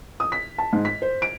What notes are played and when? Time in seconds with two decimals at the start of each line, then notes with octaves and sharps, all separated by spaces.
0.20 D#6
0.32 B6
0.58 A5
0.73 G#2
0.85 B6
1.02 C5
1.22 D7